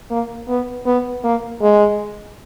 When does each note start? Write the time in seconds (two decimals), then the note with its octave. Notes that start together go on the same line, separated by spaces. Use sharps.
0.10 A#3
0.48 B3
0.86 B3
1.24 A#3
1.62 G#3